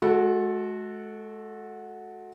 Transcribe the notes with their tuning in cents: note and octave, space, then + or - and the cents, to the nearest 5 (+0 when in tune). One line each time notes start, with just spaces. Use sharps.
G#3 +40 F#4 -10 A4 +0